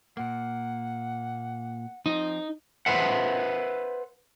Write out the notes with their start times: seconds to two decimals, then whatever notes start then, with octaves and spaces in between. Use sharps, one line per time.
0.17 A#2 A#3 F#5
2.06 F3 C4 D#4
2.86 B4 C5 E5 F#5